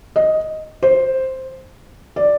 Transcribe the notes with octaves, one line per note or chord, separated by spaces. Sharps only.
D#5
C5
D5